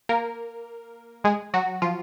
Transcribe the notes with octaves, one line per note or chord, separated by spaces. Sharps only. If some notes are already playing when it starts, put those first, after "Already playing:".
A#3 A#4
G#3 G#4
F#3 F#4
F3 F4